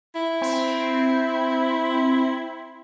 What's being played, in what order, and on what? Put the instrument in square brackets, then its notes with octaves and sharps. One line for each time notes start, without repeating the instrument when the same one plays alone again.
[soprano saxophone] E4
[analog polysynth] C4